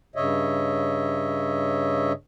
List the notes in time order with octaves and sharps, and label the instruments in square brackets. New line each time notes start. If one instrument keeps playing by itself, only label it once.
[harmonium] G2 C#3 C#5 D#5 E5